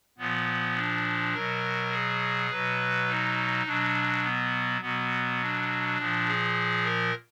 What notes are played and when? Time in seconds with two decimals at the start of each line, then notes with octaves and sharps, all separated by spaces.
0.18 A#2 F3 B3
0.76 D4
1.34 B2 F#3 A#4
1.91 G#4
2.50 B2 F#3 B4
3.08 D#4
3.66 B2 F#3 D4
4.24 B3
4.81 B2 F#3 B3
5.40 D4
5.97 A#2 F3
6.26 G#4
6.84 A#4